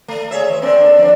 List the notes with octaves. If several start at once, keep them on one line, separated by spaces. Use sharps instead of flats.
A3
G#4 C#5 E5
E3
A#3 C4 D4
D4 A4
F3 D4